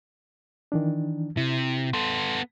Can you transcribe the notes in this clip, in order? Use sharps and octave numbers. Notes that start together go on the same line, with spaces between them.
D#3 E3 D4
C3 E4
B3 A4 C6